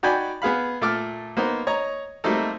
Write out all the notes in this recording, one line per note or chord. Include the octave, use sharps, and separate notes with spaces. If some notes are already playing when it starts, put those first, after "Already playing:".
D#4 F#4 D5 G5 G#5 B5
B3 G#4 F5 B5
A#2 A3 A4 A5 D6 F6
A#3 B3 D#4 C5
C#5 D#5 A#5
G3 A3 A#3 C4 D#4 A4